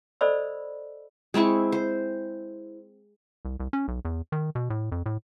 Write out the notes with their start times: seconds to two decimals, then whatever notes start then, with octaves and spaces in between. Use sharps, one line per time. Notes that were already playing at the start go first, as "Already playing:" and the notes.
0.21 A4 C5 D5 D#5 B5 E6
1.34 G#3 C4 E4 C#6
1.72 C5
3.45 C2
3.60 C2
3.73 C#4
3.88 B1
4.05 E2
4.32 D#3
4.55 B2
4.70 A2
4.92 F2
5.06 A2